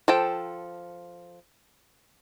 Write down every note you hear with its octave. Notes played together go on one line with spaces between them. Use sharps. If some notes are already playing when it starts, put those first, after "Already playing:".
F3 A4 G5